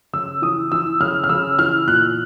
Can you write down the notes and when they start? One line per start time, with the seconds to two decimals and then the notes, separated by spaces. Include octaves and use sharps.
0.13 C#3 E6
0.42 E3 D#6
0.72 E3 E6
1.00 C#3 F6
1.24 F6
1.29 C#3 E6
1.59 E3 F6
1.87 A#2 F#6